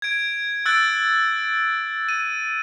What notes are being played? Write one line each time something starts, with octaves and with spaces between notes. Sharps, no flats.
G#6 D7
E6 F#6 A6 D7
D#7